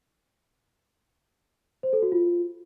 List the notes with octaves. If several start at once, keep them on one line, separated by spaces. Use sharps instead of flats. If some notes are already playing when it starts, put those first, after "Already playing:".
C5
A4
F#4
F4